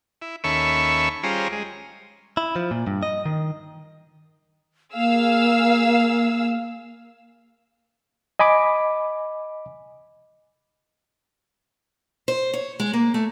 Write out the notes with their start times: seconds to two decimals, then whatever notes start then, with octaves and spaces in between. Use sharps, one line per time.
0.22 E4
0.44 D#2 C#4 A4 E5 B5 C#6
1.23 G3 C#4 F4 G#4 C5 A#5
1.52 G#3
2.37 E4
2.56 F3
2.71 A#2
2.87 G2
3.03 D#5
3.26 D#3
4.95 A#3 G#4 F5 E6
8.39 D#5 G#5 B5 D6
12.28 C5
12.54 C#5
12.80 G#3
12.93 A#3
13.14 A3